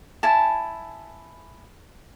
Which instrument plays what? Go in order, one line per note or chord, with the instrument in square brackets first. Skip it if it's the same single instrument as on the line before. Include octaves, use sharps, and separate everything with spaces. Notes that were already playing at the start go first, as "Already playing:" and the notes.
[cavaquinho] E4 G#5 A5